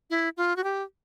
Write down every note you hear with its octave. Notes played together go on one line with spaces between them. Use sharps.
E4
F4
F#4
G4